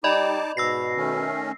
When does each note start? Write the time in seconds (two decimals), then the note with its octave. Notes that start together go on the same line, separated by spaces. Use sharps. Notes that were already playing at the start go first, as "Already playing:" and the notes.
0.04 G3 D#4 D5 D#5 A5 B5 D6
0.57 G#2 B2 E6 A#6 C7
0.96 D#3 A3 C#4